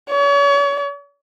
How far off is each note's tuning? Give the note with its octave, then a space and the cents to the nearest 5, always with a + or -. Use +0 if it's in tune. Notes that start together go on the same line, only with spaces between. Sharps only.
C#5 +40